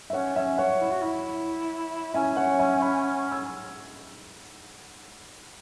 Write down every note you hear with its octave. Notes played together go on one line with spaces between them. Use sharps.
E5
C#4 C#5 F#5
C#4 E5
C#5 F#5
E4
F#4
E4
C#4 E5 G#5
C#5 F#5
E5 G#5
F#5 B5
E6 G#6